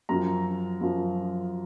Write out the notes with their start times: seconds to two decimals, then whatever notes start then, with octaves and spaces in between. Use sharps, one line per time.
0.09 F#2 F3 A#5
0.81 F#2 F3